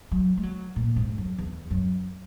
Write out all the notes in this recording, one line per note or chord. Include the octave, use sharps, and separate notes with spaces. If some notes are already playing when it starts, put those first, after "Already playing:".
F#3
G#3
F#3
A#2
G#2
F#2
E2
F#2